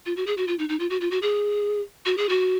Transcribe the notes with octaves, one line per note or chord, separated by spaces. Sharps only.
F4
F#4
G#4
F#4
F4
D#4
D#4
F4
F#4
F4
F#4
G#4
F#4
G#4
F#4